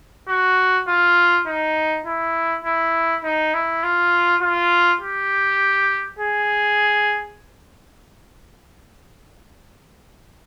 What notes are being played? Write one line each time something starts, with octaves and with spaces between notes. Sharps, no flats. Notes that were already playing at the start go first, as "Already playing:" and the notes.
F#4
F4
D#4
E4
E4
D#4
E4
F4
F4
G4
G#4